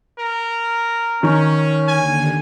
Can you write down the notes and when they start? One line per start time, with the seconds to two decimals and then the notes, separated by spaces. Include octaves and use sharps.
0.19 A#4
1.23 D#3 C#4
1.88 D#2 D3 G#5